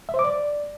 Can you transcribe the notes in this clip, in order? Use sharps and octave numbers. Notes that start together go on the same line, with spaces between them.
E5
C5
D6
D5